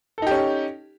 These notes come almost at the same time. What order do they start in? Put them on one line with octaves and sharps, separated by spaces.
A4 D#4 G4 C#4